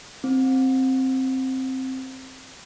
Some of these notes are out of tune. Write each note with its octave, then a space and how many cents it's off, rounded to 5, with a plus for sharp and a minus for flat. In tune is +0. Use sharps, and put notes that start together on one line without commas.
C4 +5